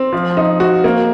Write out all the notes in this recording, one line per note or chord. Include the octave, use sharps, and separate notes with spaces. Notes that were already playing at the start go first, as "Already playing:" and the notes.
Already playing: C4
F3
D#4
F#4
A#3